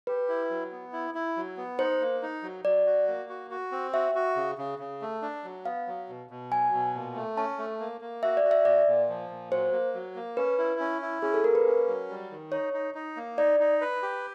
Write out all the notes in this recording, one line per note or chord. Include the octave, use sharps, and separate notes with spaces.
G4 B4
E4
F#3
B3
E4
E4
F#3
B3
D#4 C5
A#3
D#4
F#3
F#3 D5
F#4
A#3
F#4
F#4
C4
F#4 E5
F#4
C#3
C#3
C#3
A3
D4
F#3
B3 F5
F#3
B2
B2
F#3 G#5
B2
A#2
A3
C#4 A5
A3
A#3
A#3
F#4 E5
D5
F#4
E5
A#2 D5
A#2
F3
A#2
F#3 C5
A#3
F#3
A#3
C#4 B4
E4
C#4
E4
C#4 G#4
A4
A#3 A#4
B4
C#4
F#3
G3
D#3
D#4 C#5
D#4
D#4
A#3
D#4 D5
D#4
B4
G4